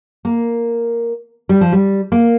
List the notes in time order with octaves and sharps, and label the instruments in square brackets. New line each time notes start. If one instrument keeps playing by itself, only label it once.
[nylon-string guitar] A#3
G3
F3
G3
A#3